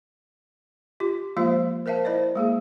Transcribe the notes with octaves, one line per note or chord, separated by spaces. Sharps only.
F4 G4
F3 G#3 A#3 F4 C5 F5
A#4 C5 E5 F5 A5
E4 C5 D5 D#5
G#3 A#3 G#4